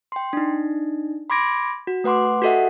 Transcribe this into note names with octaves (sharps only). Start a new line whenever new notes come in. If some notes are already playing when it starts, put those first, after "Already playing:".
G5 C6
D4 D#4
B5 C6 D6 G#6 A#6 D7
F#4
A3 B4 F#5 C6 D6
F#4 G4 A4 D#5 E5 F#5